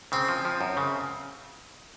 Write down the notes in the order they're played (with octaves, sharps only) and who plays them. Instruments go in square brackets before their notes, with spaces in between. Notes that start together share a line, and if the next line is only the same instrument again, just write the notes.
[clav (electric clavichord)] C#3 [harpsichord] C4
[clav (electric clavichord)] F3
F3
F#2
C#3